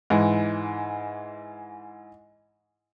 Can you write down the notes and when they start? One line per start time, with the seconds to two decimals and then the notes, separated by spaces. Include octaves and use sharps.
0.10 G#2 E3